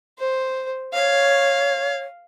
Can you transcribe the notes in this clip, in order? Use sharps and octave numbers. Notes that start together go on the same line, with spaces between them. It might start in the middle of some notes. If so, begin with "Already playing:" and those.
C5
C#5 F5